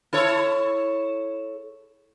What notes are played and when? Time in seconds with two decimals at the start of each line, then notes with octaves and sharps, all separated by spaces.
0.13 E4 A4 C#5